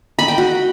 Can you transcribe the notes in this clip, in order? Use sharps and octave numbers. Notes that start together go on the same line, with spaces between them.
B5
G5
F#4